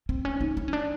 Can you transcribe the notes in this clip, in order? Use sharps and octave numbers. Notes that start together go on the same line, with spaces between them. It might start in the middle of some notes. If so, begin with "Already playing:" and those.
C4
C#4
D#4
D#4
C#4
D4